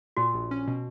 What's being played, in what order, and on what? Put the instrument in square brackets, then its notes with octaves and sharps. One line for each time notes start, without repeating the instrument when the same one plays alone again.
[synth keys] A#2 [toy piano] F#4
[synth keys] A#1
C#4
B2